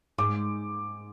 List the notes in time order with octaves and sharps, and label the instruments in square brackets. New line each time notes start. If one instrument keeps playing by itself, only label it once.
[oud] G#2 [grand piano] D6